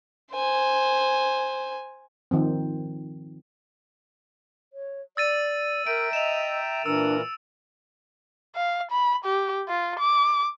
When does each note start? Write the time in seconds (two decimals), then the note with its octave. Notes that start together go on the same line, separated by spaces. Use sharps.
0.33 C5 G#5
2.31 D#3 F3 C4
4.73 C#5
5.17 D5 E6 A6 D#7
5.87 A#4 E5 G5 A#5 D7
6.13 D#5 E7 F7
6.86 A#2 E3 D4 A#4 E6
8.55 F5
8.91 B5
9.25 G4
9.68 F4
9.99 D6